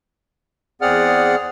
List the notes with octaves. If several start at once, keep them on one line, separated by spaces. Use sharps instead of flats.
E2 C4 G#4 D5 F#5 F6